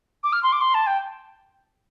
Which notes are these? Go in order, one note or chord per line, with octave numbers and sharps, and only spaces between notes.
D6
F6
C6
D6
C6
A5
G5